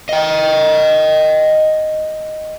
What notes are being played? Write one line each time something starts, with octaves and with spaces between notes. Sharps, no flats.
D#5 G5